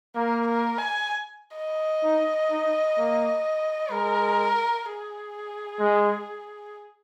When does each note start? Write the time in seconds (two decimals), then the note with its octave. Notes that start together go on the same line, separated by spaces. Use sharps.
0.16 A#3 A#4
0.47 A#4
0.78 G#5
1.57 D#5
2.03 D#4
2.51 D#4
2.98 A#3
3.92 G#3 A#4
4.85 G#4
5.80 G#3